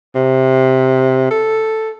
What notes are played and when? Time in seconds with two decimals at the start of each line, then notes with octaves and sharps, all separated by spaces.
0.15 C3
1.31 A4